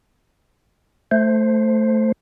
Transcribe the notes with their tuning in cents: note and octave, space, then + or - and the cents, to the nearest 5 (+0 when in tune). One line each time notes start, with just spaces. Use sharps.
A3 +0 C5 +0